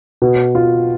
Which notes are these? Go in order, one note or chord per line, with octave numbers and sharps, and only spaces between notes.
B2
F4